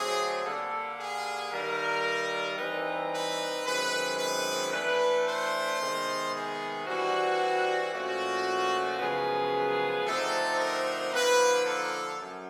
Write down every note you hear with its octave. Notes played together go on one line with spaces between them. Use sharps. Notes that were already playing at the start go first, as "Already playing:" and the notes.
Already playing: D3 F#3 A3 C4 G#4
D3 G3 A#3 A4
G#4
G2 D#3 G3 A#4
E3 G3 C4 D#4 B4
B4
F#2 D#3 G#3 C4 B4
B4
E3 A3 D4 B4
C5
C3 D#3 G#3 B3
G#4
G2 E3 G3 C4 F#4
A#2 F3 A3 C#4 F#4
F#2 C#3 F3 G#3 B3 G#4
D3 F3 A3 C4 D#4 A4
A#4
D3 F3 A#3 D#4 B4
A4
F#2